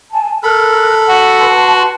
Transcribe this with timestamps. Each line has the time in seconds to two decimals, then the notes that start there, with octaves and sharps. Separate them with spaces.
0.13 G#5 A5
0.43 A4 A#4 B5 F6 F#6
1.08 F#4
1.39 B4 A5 C6